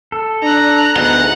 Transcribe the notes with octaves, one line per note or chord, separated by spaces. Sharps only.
A4
D4 A#5 F#6
D2 B3 D#4 G#4 F#5